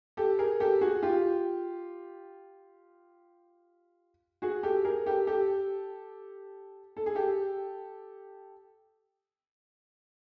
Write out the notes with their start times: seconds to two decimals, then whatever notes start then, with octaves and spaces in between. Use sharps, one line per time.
0.17 G4 A4
0.39 G#4 A#4
0.60 G4 A4
0.81 F#4 G#4
1.03 F4 G4
4.42 F#4 G#4
4.63 G4 A4
4.85 G#4 A#4
5.06 G4 A4
5.27 G4 A4
6.97 A4
7.06 G#4
7.15 G4 A4